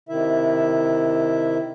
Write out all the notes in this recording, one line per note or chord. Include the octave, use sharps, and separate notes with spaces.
C3 D#3 E4 E5